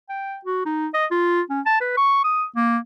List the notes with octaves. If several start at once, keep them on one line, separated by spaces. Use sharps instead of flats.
G5
F#4
D#4
D#5
F4
C#4
A5
B4
C#6
D#6
A#3